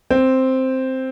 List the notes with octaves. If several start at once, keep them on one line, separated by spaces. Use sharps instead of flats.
C4